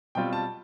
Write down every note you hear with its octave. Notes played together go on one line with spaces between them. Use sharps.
B2 G3 C4 F4 G5
A5